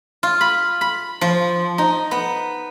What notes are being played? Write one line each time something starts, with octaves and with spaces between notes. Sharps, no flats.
F4
B5
B5
F3
D#4
B3